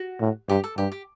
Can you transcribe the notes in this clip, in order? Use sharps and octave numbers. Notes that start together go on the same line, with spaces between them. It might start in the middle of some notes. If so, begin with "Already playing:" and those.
Already playing: F#4
A2
G2 G4
A4
G2 G4
G4